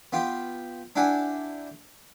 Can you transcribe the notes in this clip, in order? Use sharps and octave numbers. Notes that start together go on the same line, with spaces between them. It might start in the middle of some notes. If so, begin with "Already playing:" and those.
B3 F4 G4
D4 E4 G4 F#5 G#5